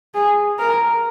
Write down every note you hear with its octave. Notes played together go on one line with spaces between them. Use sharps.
G#4
A#4